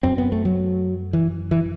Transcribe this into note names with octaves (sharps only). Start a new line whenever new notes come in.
F#2 C4
B3
A3
F#3
E3
E3